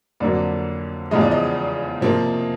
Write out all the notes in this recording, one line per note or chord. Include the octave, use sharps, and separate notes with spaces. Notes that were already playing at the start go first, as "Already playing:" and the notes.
F2 D3 F#3 A#3 D5
E2 C#3 F3 G#3 D#5
D5
D#5
C3 F3 A#3